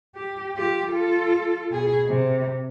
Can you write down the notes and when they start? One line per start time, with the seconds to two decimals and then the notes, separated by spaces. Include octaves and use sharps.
0.15 G4
0.56 F4 G4
0.88 F4 A4
1.71 B2 G#4
2.07 C3